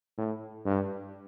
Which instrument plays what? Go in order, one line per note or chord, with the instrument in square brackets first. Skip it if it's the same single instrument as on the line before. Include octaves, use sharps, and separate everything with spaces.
[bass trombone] A2
G2